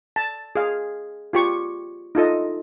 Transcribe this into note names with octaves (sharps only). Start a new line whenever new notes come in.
A5
G#4 F5
F4 G4 C#6
D#4 F4 A4 D#5